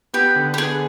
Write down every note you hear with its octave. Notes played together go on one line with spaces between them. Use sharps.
B3 G4
D3
G4
B3 G#4